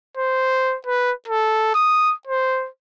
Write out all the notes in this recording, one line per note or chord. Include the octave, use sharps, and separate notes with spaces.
C5
B4
A4
D#6
C5